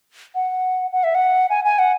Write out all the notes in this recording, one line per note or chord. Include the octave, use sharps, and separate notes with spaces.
F#5
F#5
E5
F#5
G#5
G#5
F#5